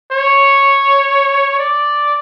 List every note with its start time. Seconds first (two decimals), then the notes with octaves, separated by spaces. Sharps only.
0.12 C#5
1.59 D5